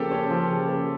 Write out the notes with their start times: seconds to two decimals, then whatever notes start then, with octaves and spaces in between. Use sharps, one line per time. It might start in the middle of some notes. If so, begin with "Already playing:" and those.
Already playing: C#3 F3 A#3 G4 A4
0.11 C#4
0.31 F3
0.49 C#3
0.68 A#3